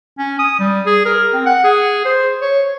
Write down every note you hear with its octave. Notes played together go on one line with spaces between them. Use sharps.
C#4
D#6
G3
G#4
A#4
C4
F#5
G#4
C5
C#5